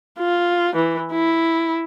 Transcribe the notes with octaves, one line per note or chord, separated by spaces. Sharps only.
F4
E3
E4